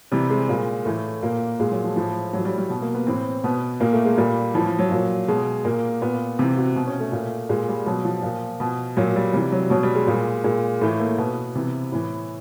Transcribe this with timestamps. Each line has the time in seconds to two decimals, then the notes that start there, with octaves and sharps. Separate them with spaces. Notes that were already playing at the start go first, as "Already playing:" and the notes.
0.12 C3 E3 G3
0.30 G#3
0.49 A#2
0.85 A2 E3 A3
1.23 A#2 A#3
1.60 A#2 G#3
1.71 F#3
1.84 F3
1.96 A2 E3 F3
2.33 A2 E3 F#3
2.45 G3
2.58 G3
2.70 B2
2.82 A#3
2.95 B3
3.07 A2 E3 C4
3.44 B2 B3
3.80 A#2 A#3
3.93 A3
4.05 G#3
4.17 A#2 G3
4.54 A2 E3 F3
4.66 F3
4.79 F#3
4.91 A#2
5.28 B2 G#3
5.65 A#2 A#3
6.02 A#2 B3
6.39 C3 E3 C4
6.57 F#4
6.76 B2
6.87 C#4
7.00 A3
7.12 A#2
7.49 A#2 G#3
7.68 G3
7.86 B2 F#3
8.05 F3
8.23 A#2
8.60 B2
8.97 A#2 F#3
9.16 G3
9.33 C3 E3 G3
9.52 F#3
9.70 B2 F#3
9.83 G3
9.95 G#3
10.07 A#2
10.44 A#2 G#3
10.81 A2 E3 A3
11.00 A#3
11.18 B2 B3
11.55 C3 E3
11.92 A2 E3